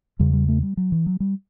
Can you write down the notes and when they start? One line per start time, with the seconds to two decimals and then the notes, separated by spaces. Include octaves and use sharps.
0.19 E2 C#3 G3
0.33 G3
0.48 A3
0.63 G3
0.77 F#3
0.92 E3
1.06 F#3
1.20 G3